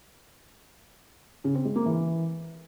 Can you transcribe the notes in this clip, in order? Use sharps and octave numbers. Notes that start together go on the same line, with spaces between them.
C#3
C4
G#3
A#3
E3